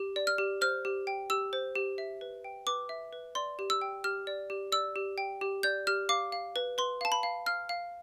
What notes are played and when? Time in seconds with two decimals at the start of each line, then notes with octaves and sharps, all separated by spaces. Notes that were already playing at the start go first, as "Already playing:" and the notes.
Already playing: G4
0.16 D5
0.27 F6
0.38 G4
0.61 C5 F6
0.85 G4
1.07 G5
1.30 G4 E6
1.53 C5
1.75 G4
1.98 E5
2.21 B4
2.44 G5
2.67 B4 D6
2.89 E5
3.13 B4
3.35 D5 C6
3.59 G4
3.70 E6
3.81 G5
4.04 G4 F6
4.27 D5
4.50 G4
4.72 D5 E6
4.96 G4
5.18 G5
5.41 G4
5.63 D5 G6
5.87 G4 F6
6.09 F5 D6
6.32 F5
6.56 B4
6.78 B4 C6
7.01 F5 A5
7.12 B5
7.23 F5
7.46 F5 F6
7.69 F5